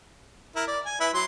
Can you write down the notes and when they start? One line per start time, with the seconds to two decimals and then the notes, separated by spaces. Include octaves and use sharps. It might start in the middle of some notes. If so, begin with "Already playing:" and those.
0.56 E4 A#4
0.67 D5
0.85 G#5
1.00 E4 B4 E5
1.14 F#3 C6